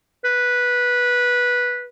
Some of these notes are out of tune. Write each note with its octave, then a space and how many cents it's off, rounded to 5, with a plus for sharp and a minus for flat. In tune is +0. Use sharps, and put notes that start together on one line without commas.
B4 -10